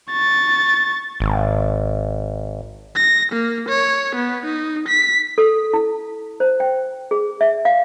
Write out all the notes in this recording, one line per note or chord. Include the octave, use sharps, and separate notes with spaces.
C#6 A6
G#1
A#6
A#3
C#5
B3
D#4
B6
A4
E4
C5
G5
G#4
E5
F5